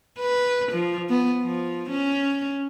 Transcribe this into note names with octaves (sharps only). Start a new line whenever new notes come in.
B4
F3
B3
F3
C#4